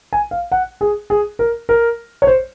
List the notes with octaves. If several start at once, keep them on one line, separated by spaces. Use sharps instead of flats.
G#5
F5
F#5
G#4
G#4
A#4
A#4
C#5
C5